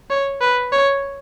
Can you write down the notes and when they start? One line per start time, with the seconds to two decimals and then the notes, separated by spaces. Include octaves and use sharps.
0.10 C#5
0.41 B4
0.72 C#5